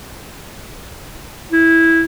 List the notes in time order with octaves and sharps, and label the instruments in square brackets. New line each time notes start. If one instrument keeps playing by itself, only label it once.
[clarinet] E4